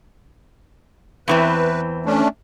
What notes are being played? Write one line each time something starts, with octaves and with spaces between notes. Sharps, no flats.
E2 E3 C4 B4
A3 C#4 D4